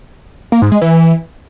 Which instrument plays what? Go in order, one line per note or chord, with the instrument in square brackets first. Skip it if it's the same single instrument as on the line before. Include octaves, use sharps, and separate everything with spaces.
[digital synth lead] A#3
G#2
G#3
E3